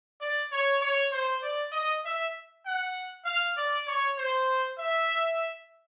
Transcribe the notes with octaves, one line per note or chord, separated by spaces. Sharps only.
D5
C#5
C#5
C5
D5
D#5
E5
F#5
F5
D5
C#5
C5
E5